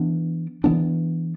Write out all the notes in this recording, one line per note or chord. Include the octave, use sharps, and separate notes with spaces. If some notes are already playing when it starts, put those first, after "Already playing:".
Already playing: E3 B3 D4
E3 B3 D4